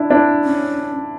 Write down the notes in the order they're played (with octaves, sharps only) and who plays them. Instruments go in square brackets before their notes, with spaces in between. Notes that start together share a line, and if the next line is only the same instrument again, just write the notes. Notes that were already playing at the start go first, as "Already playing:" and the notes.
Already playing: [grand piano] D4 E4
D4 E4
[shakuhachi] C#4